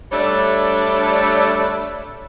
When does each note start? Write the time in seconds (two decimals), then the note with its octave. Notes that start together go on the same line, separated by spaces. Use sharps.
0.12 G3 A3 D4 C#5